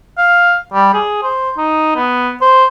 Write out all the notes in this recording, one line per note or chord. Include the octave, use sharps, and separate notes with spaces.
F5
G3
G#4
C5
D#4
B3
C5